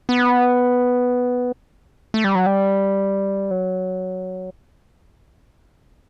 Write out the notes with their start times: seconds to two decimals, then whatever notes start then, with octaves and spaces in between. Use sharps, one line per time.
0.09 B3
2.14 A3
2.24 G3
2.35 F#3
2.46 G3
3.51 F#3